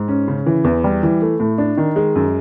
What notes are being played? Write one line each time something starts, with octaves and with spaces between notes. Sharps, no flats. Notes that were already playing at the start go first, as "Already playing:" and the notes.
Already playing: G#2
C#4
C#3
E3
E2
G3
E3
A3
A2
D4
D#3
G#3
F#2